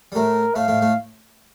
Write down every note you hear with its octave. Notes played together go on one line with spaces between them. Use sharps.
G3
A2 A3 A#4
A2 A3 F5
A2 A3
A2 A3